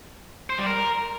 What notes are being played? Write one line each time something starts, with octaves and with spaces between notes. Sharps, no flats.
C5
G3
A#4